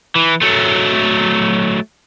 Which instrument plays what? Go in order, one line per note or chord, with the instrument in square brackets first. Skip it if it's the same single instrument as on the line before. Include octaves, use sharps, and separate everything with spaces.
[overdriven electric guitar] E3
F#3 A3